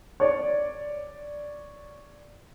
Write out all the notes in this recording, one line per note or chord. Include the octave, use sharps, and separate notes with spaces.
C#5 D5